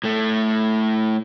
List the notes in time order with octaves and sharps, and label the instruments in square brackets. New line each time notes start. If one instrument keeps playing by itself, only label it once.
[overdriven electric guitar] A2 A3